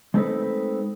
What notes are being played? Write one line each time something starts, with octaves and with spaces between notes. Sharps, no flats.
G#3 A3 C4 D#4 A4 B4